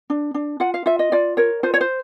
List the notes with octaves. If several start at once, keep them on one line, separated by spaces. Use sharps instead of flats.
D4
D4
F4 F#5
F5
F4 E5
D#5
F4 D5
A#4 C#5
F4 C5
C#5
C5